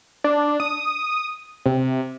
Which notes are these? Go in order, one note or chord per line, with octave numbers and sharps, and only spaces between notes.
D4
D#6
C3